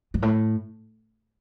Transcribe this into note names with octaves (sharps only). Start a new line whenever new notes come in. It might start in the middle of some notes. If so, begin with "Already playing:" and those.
G2
A2